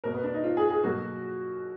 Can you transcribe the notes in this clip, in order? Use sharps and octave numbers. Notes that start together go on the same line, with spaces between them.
B2 A#3 A#4
B3
D4
D#4
F4
G#4
G#4
B2 F#3 A#3 F#4